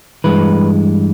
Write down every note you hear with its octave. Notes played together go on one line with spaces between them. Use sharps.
G2 E3 G#3 B4